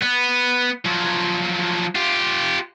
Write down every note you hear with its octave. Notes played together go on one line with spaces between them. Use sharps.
B3
F3 F#3
F4 G4